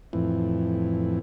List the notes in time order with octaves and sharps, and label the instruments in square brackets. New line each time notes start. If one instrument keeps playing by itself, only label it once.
[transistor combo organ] F2 A2 E3